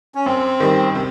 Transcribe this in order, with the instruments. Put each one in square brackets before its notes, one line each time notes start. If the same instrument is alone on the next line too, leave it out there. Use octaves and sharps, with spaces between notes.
[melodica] C#4
[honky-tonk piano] F#2 [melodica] C4
[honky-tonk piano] D#3 G3
C3